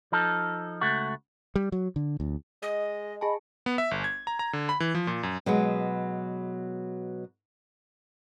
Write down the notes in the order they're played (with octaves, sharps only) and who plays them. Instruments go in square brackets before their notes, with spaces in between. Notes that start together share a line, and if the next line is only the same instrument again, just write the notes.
[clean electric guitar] F3 D#4 A4
C#2 A3 F#4
[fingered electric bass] G3
F#3
D3
D2
[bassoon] G#3 [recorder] D#5
[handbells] G#4 G#5 A5 [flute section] D#5 B5
[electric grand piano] B3
E5
G1
G#6
A#5
A#5
D3
B5
E3
F3
A#2
F#2
[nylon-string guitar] B2 F#3 G#3 B3